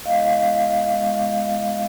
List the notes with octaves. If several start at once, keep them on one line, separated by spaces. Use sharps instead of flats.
G#3 B3 E4 D#5 F5
G#3 B3 E4